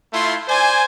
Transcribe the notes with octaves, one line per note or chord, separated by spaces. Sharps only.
A3 E4 F4 C6
C5 D5 G#5